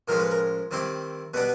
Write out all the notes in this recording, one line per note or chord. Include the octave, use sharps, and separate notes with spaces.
A2 F3 G#3 C#4 A#4
B4
A#4
D#3 G3 C4 E4
B2 G3 B3 D4 B4